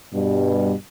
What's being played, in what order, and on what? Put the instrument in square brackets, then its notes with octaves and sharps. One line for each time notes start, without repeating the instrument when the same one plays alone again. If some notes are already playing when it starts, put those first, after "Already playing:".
[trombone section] G2 B2 G3